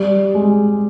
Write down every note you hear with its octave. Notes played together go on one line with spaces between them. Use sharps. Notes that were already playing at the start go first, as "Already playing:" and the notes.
Already playing: G3
G#3